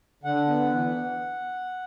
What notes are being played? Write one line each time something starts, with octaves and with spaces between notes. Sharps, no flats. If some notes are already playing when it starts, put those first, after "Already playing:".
D3 F#5
B3
E3